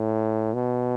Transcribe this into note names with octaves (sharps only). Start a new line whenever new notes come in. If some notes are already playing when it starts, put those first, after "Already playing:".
Already playing: A2
B2